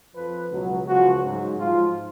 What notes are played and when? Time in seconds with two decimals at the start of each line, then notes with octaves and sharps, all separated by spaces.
0.15 F2 F3 B4
0.51 C#2 B2 F#3
0.87 C#2 C#3 F3 F#4
1.24 G#2 F#3
1.59 G#2 F3 F4